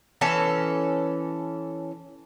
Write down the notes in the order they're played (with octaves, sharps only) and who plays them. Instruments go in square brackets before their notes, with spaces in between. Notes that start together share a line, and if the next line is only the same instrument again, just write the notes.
[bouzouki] E3 C#4 A4